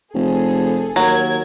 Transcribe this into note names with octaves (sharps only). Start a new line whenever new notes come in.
F1 G#4 A4
D#2 F#3 A#4 G#6